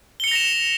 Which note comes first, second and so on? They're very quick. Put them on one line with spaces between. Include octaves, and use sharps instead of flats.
G7 C#7 F7 A#6 E7